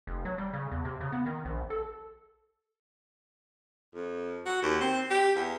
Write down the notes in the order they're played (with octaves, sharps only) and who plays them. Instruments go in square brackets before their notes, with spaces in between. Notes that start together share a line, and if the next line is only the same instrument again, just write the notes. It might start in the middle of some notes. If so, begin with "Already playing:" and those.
[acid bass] F1
F#3
G3
C#3
E2
C3
C#3
B3
D#3
A#1
A4
[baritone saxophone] F2
F#4
D#2
C4
G4
E2